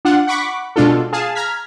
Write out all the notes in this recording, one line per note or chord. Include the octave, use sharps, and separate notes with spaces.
D4 F4 F#5
F#5 B5 C#6 D6 B6
B2 G#3 D4 F4 A4
G#4 F5 A5
A#5 F6 G#6 B6